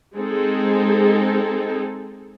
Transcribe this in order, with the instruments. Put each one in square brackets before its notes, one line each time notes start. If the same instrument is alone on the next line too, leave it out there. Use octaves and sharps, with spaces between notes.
[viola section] G#3 C4 D#4 G#4 A4